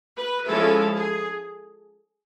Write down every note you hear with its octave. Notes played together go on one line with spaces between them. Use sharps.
B4
F3 G#3 C#4 E4 A4
G#4